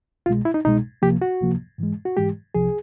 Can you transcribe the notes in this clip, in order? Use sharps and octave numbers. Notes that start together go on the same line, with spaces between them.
C2 B2 G#3 F4
E4
D#4
C2 B2 G#3 D#4
C#2 C3 F3 A#3 G4
F#4
C#2 C3 F3 A#3
G#2 E3 G#3
F#4
G#2 E3 G#3 G4
C2 C3 F3 G#4